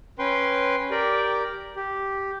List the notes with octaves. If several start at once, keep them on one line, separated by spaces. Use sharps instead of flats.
C#4 B4 G5 C6
G4 A#4 D5 G5
G4